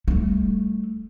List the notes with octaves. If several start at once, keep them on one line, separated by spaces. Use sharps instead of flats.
G3 A3